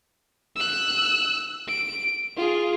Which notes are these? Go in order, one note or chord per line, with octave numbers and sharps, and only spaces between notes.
E6 F#6
D7
F4 G#4